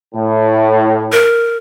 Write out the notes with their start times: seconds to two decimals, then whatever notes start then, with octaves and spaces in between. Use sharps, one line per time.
0.15 A2
1.12 A#4